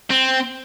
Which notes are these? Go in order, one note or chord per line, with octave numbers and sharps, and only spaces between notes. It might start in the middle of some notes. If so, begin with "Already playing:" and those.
C4